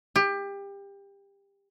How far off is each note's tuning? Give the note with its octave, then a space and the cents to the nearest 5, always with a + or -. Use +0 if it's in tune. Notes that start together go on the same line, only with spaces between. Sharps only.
G4 +25